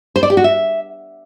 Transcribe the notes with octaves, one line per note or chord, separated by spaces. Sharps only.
C5
D5
G4
F#4
E5